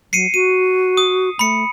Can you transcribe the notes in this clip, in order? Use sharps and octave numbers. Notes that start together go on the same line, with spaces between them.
F#3 C7 C#7 D#7
F#4 D#7
D#6
A3 B5 C#7